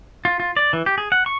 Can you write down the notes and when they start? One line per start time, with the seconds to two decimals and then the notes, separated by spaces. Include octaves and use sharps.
0.25 F4
0.40 F4
0.57 D5
0.73 E3
0.86 G4
0.98 G#4
1.12 F#5
1.26 C#6